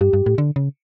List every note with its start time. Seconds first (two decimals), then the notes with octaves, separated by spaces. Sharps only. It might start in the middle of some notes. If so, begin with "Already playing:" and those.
0.01 G2 G4
0.13 G2
0.26 A2
0.38 D3
0.56 C#3